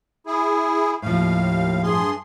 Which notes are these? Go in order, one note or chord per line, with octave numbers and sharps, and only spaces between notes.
E4 G#4
D#2 A2 F3 F5
G2 G#4 C6